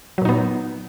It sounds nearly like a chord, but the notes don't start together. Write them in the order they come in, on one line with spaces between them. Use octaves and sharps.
F#3 A#2 D#4 B3